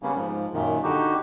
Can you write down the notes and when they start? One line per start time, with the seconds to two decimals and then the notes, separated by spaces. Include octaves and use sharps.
0.03 C#3 G3 A#3 B3 C#4
0.16 G#2 F3
0.53 F#2 A#2 D#3
0.83 D3 D#4 F#4 G4